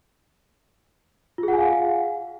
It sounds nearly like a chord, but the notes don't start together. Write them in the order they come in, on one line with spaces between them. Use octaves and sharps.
F4 G#4 F#5 G#5 F5